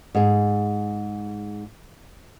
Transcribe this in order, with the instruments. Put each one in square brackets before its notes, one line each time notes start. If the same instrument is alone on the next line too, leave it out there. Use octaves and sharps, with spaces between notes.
[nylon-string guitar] G#2 G#4